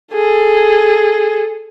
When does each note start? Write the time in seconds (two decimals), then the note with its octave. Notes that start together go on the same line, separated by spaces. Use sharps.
0.13 G#4 A4